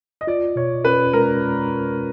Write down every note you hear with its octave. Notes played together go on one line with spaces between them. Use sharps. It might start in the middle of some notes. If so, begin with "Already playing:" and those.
D#5
F4 D5
B2 C#5
C#4 B4
G#3 A#4